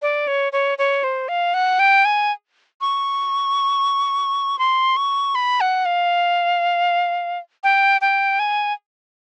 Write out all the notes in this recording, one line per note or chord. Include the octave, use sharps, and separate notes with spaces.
D5
C#5
C#5
C#5
C5
F5
F#5
G5
G#5
C#6
C6
C#6
B5
F#5
F5
G5
G5
G#5